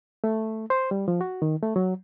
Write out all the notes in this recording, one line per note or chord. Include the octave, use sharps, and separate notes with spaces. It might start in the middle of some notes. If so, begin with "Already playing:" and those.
A3
C5
G3
F3
F#4
D#3
A3
F#3